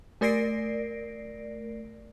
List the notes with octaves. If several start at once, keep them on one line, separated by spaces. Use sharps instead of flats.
A3 A#4 D5 A#6 C7 D7